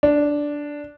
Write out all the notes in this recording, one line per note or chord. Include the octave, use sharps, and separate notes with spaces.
D4